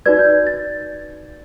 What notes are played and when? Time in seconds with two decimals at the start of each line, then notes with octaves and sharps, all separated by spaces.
0.06 D#4 F#4 B4 D5 G#6
0.19 G6
0.47 A6